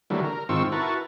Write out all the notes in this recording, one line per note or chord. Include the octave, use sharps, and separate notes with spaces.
D3 E3 F#3 G3 A3 A#3
A#4
G#2 D#3 C4 F4 C#6 E6
E4 F#4 A#4 B4 A5 C#6